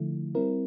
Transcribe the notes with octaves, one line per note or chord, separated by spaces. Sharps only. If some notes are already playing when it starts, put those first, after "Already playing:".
Already playing: D3 F3 A3 E4
G3 C4 E4 A#4